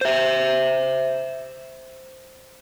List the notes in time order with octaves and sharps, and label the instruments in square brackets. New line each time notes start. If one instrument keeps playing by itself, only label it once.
[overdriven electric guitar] C5 E5